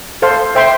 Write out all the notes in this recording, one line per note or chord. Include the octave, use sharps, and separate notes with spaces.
A4 C5 F5 C6
C5 E5 G5 C6